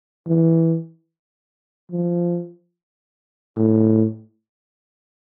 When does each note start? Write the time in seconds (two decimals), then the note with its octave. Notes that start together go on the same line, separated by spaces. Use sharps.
0.27 E3
1.91 F3
3.56 A2